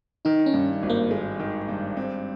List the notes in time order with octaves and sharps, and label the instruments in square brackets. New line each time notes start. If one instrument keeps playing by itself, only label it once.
[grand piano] D#3 [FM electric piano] D#4
[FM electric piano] C#4
[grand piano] G2
G#1
[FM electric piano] A#3
[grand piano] G#3
D#3
G2
C4